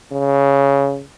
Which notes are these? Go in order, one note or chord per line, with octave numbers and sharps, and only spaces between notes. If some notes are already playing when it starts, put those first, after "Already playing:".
C#3